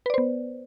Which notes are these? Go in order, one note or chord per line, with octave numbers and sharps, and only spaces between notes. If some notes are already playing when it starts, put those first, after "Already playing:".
B3 B4 C5 D5